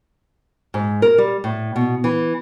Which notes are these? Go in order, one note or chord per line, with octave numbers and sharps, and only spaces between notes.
G#2
A#4
G3
A2
B2
E3